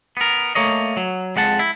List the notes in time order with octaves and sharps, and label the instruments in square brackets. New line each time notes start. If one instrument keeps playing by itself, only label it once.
[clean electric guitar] B3 A#4
A3 A#3 C#5 D#5
F#3
F2 G#3 F#5 A5
E4